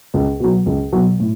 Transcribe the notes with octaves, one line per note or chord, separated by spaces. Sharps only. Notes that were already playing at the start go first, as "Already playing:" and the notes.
C#2
B2 F#3
C#2
B2 F#3
A2